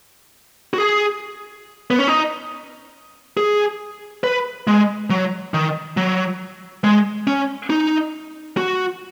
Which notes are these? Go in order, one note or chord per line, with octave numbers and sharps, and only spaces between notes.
F#4
G#4
B3
C#4
D#4
G#4
B4
G#3
F#3
D#3
F#3
G#3
C#4
D#4
F#4